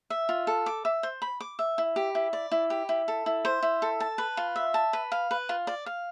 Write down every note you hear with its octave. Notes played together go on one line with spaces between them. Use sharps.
E5
F4
A4
D6
E5
C5
B5
D6
E5
E4
G4
E4
D5
E4
G4
E4
A4
E4
C5
E4
A4
A5
B4
F4
E5
A5
B4
F5
B4
F4
D5
F5